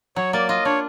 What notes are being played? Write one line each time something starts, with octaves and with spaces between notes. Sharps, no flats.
F#3 C#5
A#3 D5
F4 D#5
D4 C#5